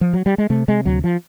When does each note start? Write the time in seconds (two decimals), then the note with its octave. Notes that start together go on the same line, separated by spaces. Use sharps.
0.01 F3
0.13 F#3
0.26 G3
0.38 G#3
0.50 C3 A3
0.68 C3 G#3
0.85 D2 F#3
1.04 F3